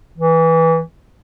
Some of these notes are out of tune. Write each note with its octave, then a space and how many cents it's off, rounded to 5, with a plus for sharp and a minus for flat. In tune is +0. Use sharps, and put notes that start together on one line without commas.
E3 -10